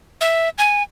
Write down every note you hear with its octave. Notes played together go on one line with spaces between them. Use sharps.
E5
G#5